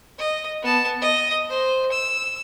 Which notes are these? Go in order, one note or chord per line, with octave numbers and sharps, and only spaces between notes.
D#5
B3 A5
D#5
C5
E6